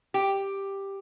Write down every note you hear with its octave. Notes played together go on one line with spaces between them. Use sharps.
G4